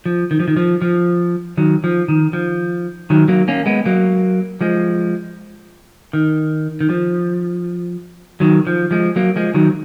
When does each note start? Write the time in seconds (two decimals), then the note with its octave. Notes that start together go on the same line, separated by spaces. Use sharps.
0.06 F3
0.31 D#3
0.40 F3
0.48 D#3
0.57 F3
0.82 F3
1.57 D#3 F#3
1.84 F3
2.08 D#3
2.33 F3
3.10 D#3 F#3
3.28 F#3 A#3
3.48 A#3 C#4
3.66 G#3 B3
3.85 F#3 A#3
4.61 F3 G#3
6.13 D#3
6.81 D#3
6.90 F3
8.40 D#3 F#3
8.67 F3
8.91 F3 G#3
9.16 F#3 A#3
9.36 F3 G#3
9.54 D#3 F#3